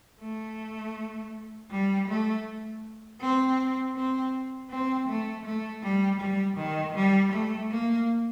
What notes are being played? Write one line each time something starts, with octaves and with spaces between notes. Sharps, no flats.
A3
G3
A3
C4
C4
C4
A3
A3
G3
G3
D#3
G3
A3
A#3